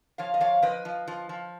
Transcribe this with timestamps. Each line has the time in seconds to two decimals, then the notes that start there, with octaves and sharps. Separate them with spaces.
0.18 F3 C#5 F5
0.34 D#5
0.41 F3 C#5 F5
0.62 F3 B4 D#5
0.85 F3
1.08 F3
1.29 F3